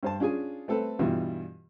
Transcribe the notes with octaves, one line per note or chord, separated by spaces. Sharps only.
G2 C5 A5
C#4 D4 F4 G#4 G#5
A3 C4 A4 B4
G2 B2 E3 G3 F4